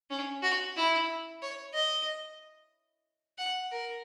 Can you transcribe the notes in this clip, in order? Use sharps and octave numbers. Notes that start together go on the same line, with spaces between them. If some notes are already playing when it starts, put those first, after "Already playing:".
C#4
F#4
E4
C#5
D#5
F#5
A#4